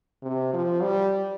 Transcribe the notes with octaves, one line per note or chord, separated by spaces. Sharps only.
C3
F3
G3